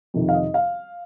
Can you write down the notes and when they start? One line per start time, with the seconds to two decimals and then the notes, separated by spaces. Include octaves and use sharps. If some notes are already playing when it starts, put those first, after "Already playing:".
0.14 F2 C3 D#3
0.29 F5
0.34 D#5
0.54 F5